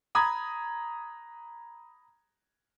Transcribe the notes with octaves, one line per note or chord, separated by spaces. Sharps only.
A#5 B5 D#6 G#6